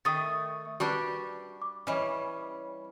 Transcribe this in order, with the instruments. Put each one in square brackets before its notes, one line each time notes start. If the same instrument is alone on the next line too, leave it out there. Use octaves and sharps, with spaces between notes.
[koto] D#3 [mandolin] A3 C#6 D#6 [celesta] G5 A6
[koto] G3 D4 G4 [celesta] F#4 B4 [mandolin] C#6
[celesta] D6
[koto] E3 G3 [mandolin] C#4 [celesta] C#5 D#5 G#5